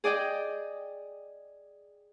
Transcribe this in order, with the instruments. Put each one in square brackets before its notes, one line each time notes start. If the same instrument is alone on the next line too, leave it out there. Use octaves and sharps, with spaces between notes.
[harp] G#4 D5 D#5 G5